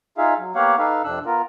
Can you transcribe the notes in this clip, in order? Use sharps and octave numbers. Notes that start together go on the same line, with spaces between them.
D#4 F4 G#4 E5 F5
F#3
A#3 B3 G4 C#5 F5 F#5
D#4 A4 B4 F5
F2 C3 D4 E6 F#6
B3 F4 A#4